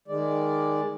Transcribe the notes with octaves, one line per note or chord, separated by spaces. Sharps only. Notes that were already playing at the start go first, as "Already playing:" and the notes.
D#3 G#3 D5